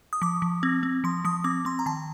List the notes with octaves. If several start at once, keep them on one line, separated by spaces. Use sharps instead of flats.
D#6
F3 D6
F3
C4
C4
F3 C6
F3 D#6
C4 D6
C4 C6
A#5
D#3 A5